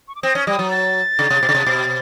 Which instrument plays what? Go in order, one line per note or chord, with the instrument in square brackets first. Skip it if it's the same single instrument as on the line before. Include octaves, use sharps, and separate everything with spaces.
[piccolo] C#6
D6
[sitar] C4 [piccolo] D#6
[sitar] C#4
[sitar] G3 [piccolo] D#6
[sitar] F#3
[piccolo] A6
[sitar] C#3
C3
B2
C#3
C3
B2